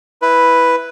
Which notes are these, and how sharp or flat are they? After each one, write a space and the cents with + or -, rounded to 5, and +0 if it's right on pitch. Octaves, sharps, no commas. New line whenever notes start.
E4 +0 B4 +0